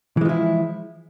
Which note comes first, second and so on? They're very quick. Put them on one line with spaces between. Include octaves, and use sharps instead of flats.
E3 G#3 F3 E4